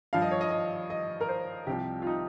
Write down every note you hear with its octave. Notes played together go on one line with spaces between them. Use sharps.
G2 F3 F5
D#5
C#5
D#5
D#5
D#5
A#4
C5
C2 C3 F3 G4
F4
D#4